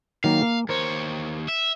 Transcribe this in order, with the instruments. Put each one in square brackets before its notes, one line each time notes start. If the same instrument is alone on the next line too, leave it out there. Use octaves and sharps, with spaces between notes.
[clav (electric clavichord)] D#3 F#3 A#3 [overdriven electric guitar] F5
[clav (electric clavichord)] A#3
[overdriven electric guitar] D#2 C#5 [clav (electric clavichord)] A#4 C5
[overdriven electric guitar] E5